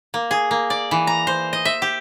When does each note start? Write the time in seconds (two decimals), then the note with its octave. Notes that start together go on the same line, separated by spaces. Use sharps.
0.14 A#3
0.31 G#4
0.51 A#3
0.70 D5
0.91 E3
1.07 A#5
1.27 C5
1.53 D#5
1.65 E5
1.82 G4